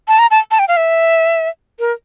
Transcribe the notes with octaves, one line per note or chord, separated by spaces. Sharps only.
A5
A#5
A5
A5
G5
F5
E5
A#4